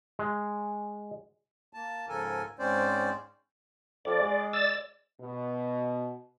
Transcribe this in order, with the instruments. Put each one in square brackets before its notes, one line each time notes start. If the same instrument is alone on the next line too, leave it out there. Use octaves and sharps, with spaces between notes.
[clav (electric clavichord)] G#3
[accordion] A#3 A5
G#2 C#3 F3 A4 A#4 G#5
G#2 G#3 C4 C#4 C5 D5
[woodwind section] F2 [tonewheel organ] D5
[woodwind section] G#3
[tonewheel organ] D5 E6 A6
[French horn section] B2